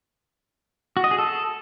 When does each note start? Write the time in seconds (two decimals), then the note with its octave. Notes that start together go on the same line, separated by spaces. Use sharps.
0.97 F#4
1.04 D#5
1.11 G#4
1.18 A4